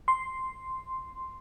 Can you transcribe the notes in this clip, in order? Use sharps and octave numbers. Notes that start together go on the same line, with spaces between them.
C6